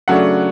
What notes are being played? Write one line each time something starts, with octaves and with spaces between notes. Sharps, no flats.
C#3 F#3 A3 D4 F#5